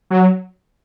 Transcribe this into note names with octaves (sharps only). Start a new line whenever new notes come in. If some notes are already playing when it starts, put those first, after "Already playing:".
F#3